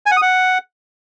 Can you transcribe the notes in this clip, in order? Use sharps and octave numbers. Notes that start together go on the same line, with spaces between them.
G#5
F#5
D#6
F#5